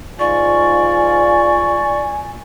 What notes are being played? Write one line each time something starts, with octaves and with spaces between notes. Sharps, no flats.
G#2 F4 D5 G#5 C#6